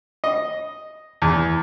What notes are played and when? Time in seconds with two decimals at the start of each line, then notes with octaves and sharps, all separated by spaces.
0.24 D#5
1.22 E2